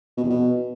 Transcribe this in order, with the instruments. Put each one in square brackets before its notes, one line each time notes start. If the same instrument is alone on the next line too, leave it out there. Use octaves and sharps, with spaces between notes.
[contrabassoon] B2
E2
B2